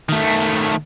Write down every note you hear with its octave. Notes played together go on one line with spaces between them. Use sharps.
D#3 A3